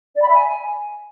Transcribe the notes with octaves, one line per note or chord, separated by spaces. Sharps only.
D5
B5
E5
G#5